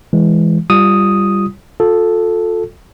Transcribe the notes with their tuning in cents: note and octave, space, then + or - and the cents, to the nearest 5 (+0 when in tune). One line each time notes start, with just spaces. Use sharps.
E3 +0 G#3 +0
G3 +0 F4 -20 D#6 +0
F4 +35 A4 +0